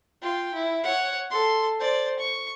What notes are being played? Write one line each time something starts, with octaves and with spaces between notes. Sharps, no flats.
F4 G5
E4
C#5 F#5
A4 C6
C5 D5
C#6